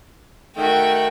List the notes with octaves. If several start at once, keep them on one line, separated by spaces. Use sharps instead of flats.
D#3 A3 F#4 G5